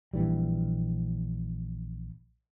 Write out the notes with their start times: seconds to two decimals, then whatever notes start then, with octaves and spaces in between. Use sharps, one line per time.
0.14 A#1 E3 G3